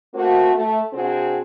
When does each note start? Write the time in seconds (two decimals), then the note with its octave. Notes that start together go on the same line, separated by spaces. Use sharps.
0.15 A3 A#3 C4 F#4
0.54 A3
0.92 C3 C4 D4 F#4 G#4